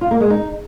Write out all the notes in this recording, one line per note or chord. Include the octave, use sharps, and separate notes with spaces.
F4
A#3
G#3
D#4